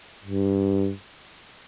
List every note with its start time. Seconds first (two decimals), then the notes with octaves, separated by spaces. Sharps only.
0.24 G2